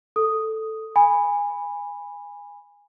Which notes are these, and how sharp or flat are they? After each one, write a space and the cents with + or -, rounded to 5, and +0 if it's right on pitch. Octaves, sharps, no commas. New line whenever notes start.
A4 +0 D#6 +0
G#5 -20 B5 +0